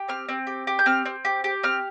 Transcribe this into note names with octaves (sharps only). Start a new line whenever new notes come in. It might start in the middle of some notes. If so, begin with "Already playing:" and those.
Already playing: G4
C4 F6
C4
G4
G4
G6
C4 F6
C4
G4
G4
C4 F6